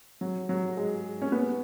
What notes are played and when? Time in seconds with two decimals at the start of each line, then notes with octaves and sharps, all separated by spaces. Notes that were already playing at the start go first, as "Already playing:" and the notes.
0.21 F#3
0.49 F#3
0.77 G#3
1.22 C#4
1.32 B3